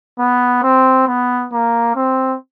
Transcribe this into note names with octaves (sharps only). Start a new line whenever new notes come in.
B3
C4
B3
A#3
C4